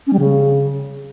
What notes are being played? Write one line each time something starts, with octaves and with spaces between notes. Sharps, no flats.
C#4
G3
C#3